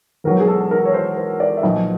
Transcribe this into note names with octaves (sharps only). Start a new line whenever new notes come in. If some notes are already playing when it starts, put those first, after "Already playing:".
E1 E2 B2 F#3 A#4
G#4
A4
A#4
C#5
C5
C5
D5
E5
B1 A#2 F3 D#5